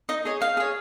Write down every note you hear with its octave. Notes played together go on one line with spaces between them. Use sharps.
D#4 D#5
G#4 C#5 D#5
D#4 F5
G#4 C#5